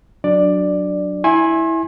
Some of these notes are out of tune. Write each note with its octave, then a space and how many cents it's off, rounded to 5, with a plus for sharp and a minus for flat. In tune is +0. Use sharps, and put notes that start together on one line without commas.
F#3 +0 D4 +0 D5 +10
E4 -10 G#5 +0 C6 +40